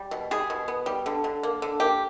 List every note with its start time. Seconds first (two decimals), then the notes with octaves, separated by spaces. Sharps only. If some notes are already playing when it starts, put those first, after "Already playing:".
Already playing: G3
0.11 B2
0.31 G3 G#4
0.50 B2
0.68 B3
0.86 G3
1.06 D3
1.24 D3
1.43 A#3
1.62 D3
1.80 A#3 G4